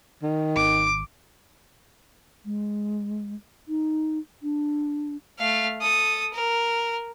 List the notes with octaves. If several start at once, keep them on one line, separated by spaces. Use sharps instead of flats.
D#3
G#1 D6
G#3
D#4
D4
A3 F5
A4 D#6
A#4